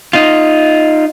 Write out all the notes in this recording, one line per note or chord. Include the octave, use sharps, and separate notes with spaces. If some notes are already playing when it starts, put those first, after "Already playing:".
D#4 F4